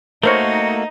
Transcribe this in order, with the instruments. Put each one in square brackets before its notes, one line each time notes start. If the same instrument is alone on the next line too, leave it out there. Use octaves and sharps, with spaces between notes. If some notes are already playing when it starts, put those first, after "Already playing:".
[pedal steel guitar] A3 A#3 F#4 [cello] D#4 [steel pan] A#4 C5 C#5